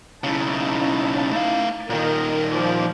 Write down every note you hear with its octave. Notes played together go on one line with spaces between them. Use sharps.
B1 C#3 D#4 E4 A5
A3 F5
A#2 D#3 A#4 D#5
F3 D5